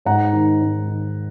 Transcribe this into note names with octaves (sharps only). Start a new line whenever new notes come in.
G#2 F#5 A#5
D#3
G#2
D#3